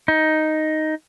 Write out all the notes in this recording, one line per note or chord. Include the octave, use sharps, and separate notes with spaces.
D#4